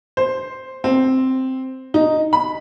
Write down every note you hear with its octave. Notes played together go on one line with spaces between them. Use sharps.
C5
C4
D#4
B5